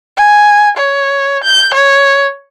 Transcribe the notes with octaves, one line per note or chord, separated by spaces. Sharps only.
G#5
C#5
G6
C#5